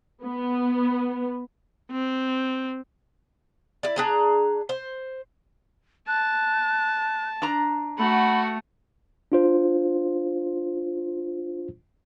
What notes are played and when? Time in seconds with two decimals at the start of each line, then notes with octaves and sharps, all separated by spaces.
0.24 B3
1.91 C4
3.83 E4 D5
3.96 D4 G#4 A#5
4.69 C5
6.08 A5 F#6
7.42 D4 A#5
7.98 A3 F#4 F#5 B5
9.32 D4 F4 C5